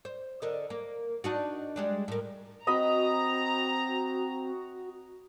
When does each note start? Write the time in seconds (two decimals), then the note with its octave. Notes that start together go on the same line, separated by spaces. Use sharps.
0.05 C5
0.42 D3 A#4 D#5
0.70 A#3
1.24 D4 D#4 F#4
1.76 G3 G#3 D4
2.08 A2 A#4
2.67 C4 F#4 D#5 A#5 B5